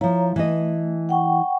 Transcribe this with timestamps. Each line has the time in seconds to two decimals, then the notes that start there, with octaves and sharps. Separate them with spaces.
0.01 F3 E4 C#5 F5 A#5
0.36 E3 A3 D#5
1.09 F#5 G5 C#6